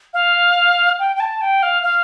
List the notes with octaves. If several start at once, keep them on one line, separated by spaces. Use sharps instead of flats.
F5
G5
G5
A5
G5
F5
F5